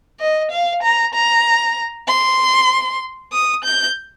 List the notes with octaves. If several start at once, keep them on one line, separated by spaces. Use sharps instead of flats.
D#5
F5
A#5
A#5
C6
D#6
G6